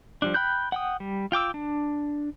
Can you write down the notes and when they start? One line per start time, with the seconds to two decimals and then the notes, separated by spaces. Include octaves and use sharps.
0.22 F3 G3 D4
0.34 G5 B5 F#6 G6
0.72 F#5 G5 D#6
1.00 G3
1.32 F4 G5 D6 E6
1.54 D4